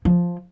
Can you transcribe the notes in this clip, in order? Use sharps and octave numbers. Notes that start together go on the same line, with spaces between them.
F3